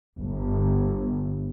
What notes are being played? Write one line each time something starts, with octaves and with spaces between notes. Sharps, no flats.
G1